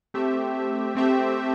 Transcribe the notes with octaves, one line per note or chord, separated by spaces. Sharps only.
A3 C4 G4 E5
A3 C4 G4 E5